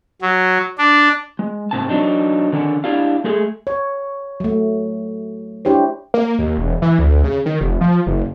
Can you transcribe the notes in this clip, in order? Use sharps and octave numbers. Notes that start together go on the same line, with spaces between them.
F#3
D4
G#3
G#2 C3 A5
F#3 D4 D#4
D3 D#3 C#4 D4 F#5
D4 E4 G4 F5
G#3 A3 G#4
C#5
F#3 A3
D4 E4 G4 C5 C#5
A#3
D#2
E1
E3
D2
C#3
D#3
F1
F3
F#1